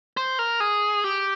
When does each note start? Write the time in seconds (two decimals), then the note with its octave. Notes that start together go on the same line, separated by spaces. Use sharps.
0.17 C5
0.39 A#4
0.60 G#4
1.04 G4